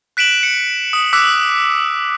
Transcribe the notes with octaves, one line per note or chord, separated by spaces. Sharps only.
F#6 B6 D7 E7 F#7
C#7
D#6
D6 E6 F#6 B6